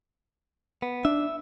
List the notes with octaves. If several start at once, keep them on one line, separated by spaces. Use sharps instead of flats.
B3
D4 E5